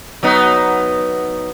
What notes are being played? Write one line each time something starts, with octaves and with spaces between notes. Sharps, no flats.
F#3 B3 D#4